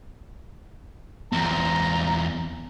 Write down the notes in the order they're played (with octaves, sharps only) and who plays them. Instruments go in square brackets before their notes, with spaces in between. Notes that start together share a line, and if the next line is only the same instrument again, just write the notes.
[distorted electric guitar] E2 C4 [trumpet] A#5